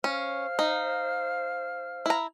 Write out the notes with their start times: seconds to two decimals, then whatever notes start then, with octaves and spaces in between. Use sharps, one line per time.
0.04 C#4 C5 F5 F6
0.59 D#4
2.06 E4 A#5